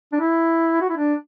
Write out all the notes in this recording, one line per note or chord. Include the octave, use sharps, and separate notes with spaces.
D4
E4
F#4
E4
D4